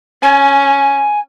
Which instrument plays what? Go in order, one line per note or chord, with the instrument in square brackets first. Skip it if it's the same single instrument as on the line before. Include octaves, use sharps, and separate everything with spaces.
[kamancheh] C#4 [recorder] G#5